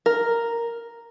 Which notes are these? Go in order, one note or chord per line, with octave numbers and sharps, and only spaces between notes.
A#4